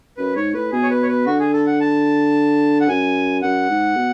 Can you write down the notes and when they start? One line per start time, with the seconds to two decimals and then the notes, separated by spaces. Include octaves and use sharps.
0.17 F#2 B4
0.36 G#2 C#5
0.54 A2 B4
0.72 B2 G#4
0.83 C#5
0.90 B4
1.03 C#5
1.08 B4
1.26 D3 F#4
1.39 G#4
1.53 A4
1.67 F#5
1.81 A5
2.80 F#5
2.89 F#2 G#5
3.42 F#2 F#5
3.70 G#2
3.96 B2